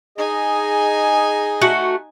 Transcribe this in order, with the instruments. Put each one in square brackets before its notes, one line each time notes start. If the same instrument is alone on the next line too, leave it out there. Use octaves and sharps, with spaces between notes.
[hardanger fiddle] D#4 G#5 [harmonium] G#4 D#5
[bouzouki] A3 F#4 F#5